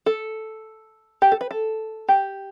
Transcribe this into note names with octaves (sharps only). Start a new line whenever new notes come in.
A4
G4
A4
B4
A4
G4